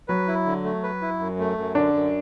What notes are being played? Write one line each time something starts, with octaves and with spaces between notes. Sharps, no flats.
F#3 B4
E4
D3
A3
B4
E4
F#2
A3
F#2
D3 D4
F#2